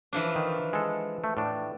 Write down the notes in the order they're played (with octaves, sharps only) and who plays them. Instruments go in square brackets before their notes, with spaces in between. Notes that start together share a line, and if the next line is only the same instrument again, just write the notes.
[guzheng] E3 F3 D4
[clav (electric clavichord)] D#3
G#3 A4
A3
A2 D4